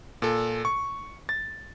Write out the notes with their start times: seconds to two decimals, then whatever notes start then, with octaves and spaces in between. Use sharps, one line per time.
0.22 A#2 A4
0.65 C#6
1.29 A6